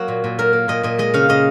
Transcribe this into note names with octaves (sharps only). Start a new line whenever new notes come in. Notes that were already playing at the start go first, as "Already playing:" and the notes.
Already playing: F#3 A#3 F#4
A#2
A#2
F#3 A#4
A#3
A#2 D#5
A#2 D#5
G#3 D#5
C#3 F5
C#3 D#5